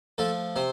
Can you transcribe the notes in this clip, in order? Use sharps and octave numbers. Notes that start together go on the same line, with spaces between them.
F3 A3 A4
C3 C5